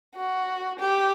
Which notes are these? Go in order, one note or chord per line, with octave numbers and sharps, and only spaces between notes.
F#4
G4